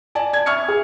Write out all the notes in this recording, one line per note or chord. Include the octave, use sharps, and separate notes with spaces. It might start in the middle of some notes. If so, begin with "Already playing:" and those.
D5 G#5 A5
G#6
E5 C#6 F6 G#6 C#7
G#4